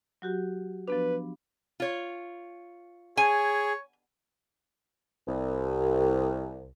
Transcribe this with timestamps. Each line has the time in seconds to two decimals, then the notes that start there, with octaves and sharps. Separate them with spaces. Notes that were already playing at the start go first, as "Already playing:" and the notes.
0.22 F#3 F#4 G4
0.88 F3 B3 D4 B4
1.80 F4 C#5
3.17 G#4 C#5 G#5
5.27 C2